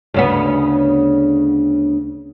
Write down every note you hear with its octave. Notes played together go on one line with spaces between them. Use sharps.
D2 C#3 B3